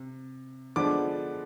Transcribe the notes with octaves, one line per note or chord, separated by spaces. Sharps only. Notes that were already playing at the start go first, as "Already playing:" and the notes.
Already playing: C3
D3 F3 G#3 B3 D4 D6